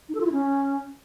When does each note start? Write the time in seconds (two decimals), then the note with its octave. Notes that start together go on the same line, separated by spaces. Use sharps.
0.09 D#4
0.15 A4
0.21 F4
0.26 E4
0.32 C#4